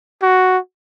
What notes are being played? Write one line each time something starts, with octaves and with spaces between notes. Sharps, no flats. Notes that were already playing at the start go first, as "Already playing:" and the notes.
F#4